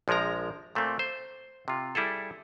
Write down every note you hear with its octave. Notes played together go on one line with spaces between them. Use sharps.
A#1 F3 G#3 A#4 A#5
A#2 A3 A#3 C4
C5
C3 F4
G3 E4 G#4 A4